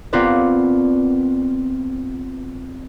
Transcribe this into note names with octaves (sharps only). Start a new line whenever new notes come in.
B3 C4 F4 A#4 B4 D5